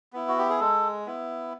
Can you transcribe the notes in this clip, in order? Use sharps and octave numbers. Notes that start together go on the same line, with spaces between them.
B3 E4
F#4
G4
G#4
G#3 A4
B3 E4